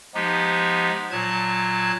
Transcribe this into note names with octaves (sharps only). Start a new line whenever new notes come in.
F3 G#3 B3 D#4 G4
A#2 F#3 A5 G#6